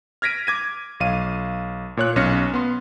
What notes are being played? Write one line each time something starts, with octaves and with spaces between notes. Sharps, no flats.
F6 G#6 A#6 B6 D7 D#7
D6 G#6 D#7
B1 F5 D#7
A#2 C#5 F#6
B1 C#4 F6 A#6 C#7
B3 C6